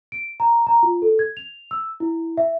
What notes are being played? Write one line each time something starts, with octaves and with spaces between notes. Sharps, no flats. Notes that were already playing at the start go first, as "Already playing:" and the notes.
D7
A#5
A#5
F4
A4
G#6
F7
E6
E4
E5